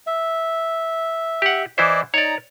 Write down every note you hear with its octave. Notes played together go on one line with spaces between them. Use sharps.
E5
G4 F#5
E3 E4 C5 D5 D#5 D6
D#4 C#5 D5 A#5